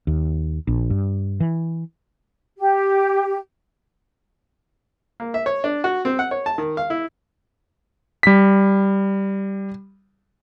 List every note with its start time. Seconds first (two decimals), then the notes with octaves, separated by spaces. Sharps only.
0.07 D#2
0.67 A#1
0.90 G2
1.40 E3
2.58 G4
5.20 A#3
5.34 E5
5.46 C#5
5.64 D4
5.84 F#4
6.05 C4
6.19 F#5
6.31 C#5
6.46 A5
6.58 D#3
6.77 F5
6.90 E4
8.23 G3 B6